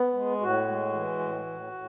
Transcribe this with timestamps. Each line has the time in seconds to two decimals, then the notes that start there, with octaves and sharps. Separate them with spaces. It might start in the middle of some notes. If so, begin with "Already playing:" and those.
Already playing: B3
0.14 G#3
0.41 A2 F#4
0.68 G#3
0.93 E3
1.19 A2
1.46 A2
1.72 A2